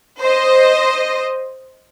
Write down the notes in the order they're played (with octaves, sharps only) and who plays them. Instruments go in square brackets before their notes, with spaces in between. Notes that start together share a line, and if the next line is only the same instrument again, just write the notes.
[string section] C5 D#5